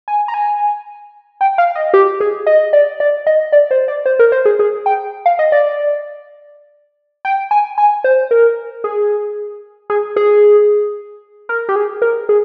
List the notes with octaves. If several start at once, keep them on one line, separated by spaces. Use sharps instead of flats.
G#5
A#5
G#5
G5
F5
D#5
G4
G#4
D#5
D5
D5
D#5
D5
C5
D5
C5
A#4
C5
G#4
G#4
G5
F5
D#5
D5
G5
G#5
G#5
C5
A#4
G#4
G#4
G#4
A#4
G4
G#4
A#4
G#4